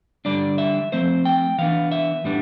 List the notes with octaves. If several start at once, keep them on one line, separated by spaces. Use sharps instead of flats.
D3 G3 D4 D5
E5
F3 A3 C4 C5
G5
E3 B3 D4 F5
E5
A2 G3 B3 D4